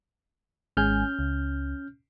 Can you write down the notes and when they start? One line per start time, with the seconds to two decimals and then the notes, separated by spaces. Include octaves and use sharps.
0.77 G#1 G#3 C#4 G#5 F6 G6
1.19 C#2